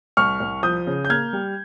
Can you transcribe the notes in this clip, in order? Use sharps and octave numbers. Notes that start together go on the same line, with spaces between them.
C2 C#6 F6
C2
F3 D#6 G6
C#3
G6
A#3 F6 G#6
G3